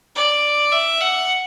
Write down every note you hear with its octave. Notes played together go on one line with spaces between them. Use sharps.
D5
E5
F#5